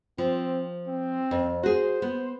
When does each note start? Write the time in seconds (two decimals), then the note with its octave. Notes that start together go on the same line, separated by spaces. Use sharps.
0.18 F3 C4
0.86 C4
1.31 F2
1.63 F#4 G#4 C5
2.02 B3